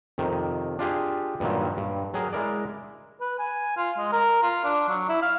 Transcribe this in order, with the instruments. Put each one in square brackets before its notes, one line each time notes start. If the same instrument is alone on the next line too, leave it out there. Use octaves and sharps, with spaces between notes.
[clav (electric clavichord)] F2 C3 D#3
D4 F4 G4 G#4
G2 A#2 D#3 F#3
G2
F#3 G#4 A#4
G#3 E4 A#4 D5
[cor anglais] B4
G#5
F4
G#3
A#4
F4
D4
F#3
E4
F5